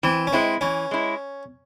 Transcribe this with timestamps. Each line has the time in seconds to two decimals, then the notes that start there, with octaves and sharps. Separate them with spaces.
0.03 E3 C4
0.27 C#4
0.33 G#3 C4 E4
0.61 E3 C#4
0.91 G#3 E4